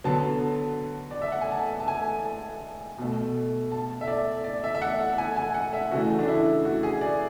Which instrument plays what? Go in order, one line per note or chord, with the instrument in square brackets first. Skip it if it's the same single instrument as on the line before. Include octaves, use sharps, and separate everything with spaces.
[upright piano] D3 F#3 B3 A5
D5
E5
F#5
G#5
A5
A5
G#5
B2 A3
A5
E5
D5
D5
E5
E5
F#5
G#5
G#5
F#5
E5
C#3 E3 A3 F#4
D4
E4
F#4
G#4
D5